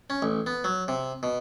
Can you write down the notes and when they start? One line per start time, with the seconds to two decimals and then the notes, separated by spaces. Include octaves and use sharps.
0.10 C#4
0.22 A1
0.46 B3
0.64 F#3
0.88 C3
1.23 B2